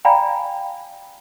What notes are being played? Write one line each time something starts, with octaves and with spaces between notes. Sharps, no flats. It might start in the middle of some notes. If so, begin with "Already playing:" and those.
D5 F5 G5 G#5 A#5 B5